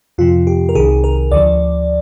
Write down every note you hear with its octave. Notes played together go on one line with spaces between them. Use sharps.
F2 C3 F3 F4
G4
A#4
C2 C3 D#3 G#4
A#4
D2 D3 F3 D5